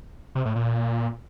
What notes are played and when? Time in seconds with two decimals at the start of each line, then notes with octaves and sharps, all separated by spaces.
0.35 C3
0.45 A2
0.56 A#2